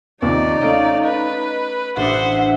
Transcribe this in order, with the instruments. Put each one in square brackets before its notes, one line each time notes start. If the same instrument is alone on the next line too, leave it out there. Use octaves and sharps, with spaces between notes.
[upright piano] D#2 C3 F3 [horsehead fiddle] D#4 [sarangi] D5 [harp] E6
[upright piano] A3 C#4 [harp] D#5 F5 D7
[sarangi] B4
[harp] A1 D4 D#6 [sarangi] C5 [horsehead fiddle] E5 F#5